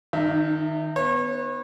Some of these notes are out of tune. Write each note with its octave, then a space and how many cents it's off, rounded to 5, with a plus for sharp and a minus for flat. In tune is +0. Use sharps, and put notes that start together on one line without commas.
D#3 +0 D#4 -45 E5 +0
B3 +0 C#5 -40